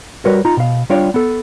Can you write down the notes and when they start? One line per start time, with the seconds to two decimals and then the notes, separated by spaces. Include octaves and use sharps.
0.25 G3 F#4 A#4 B4 C#5
0.45 D#4 F4 A#5
0.57 B2 F5
0.90 G3 D4 F4 C#5 F5 G5
1.14 B3 A4